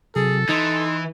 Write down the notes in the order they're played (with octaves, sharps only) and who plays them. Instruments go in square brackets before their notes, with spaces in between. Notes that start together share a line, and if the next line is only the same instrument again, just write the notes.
[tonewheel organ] C3 F#3 [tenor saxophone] G#4 [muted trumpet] A4
[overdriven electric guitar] E3 [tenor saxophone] D#4 [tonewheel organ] C6